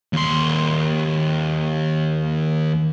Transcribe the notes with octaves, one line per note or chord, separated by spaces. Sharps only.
D#2 C6